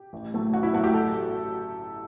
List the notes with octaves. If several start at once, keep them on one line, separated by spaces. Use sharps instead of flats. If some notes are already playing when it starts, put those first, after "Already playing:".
Already playing: G4
A1
A2 F#3 A3
A1 F#4
E4
A2 F#3 A3 F#4
G4
A4